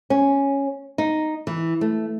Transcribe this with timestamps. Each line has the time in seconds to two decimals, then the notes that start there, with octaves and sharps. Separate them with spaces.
0.10 C#4
0.98 D#4
1.47 E3
1.81 A3